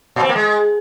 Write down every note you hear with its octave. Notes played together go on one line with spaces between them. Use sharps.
A#2
C4
A#3
G#3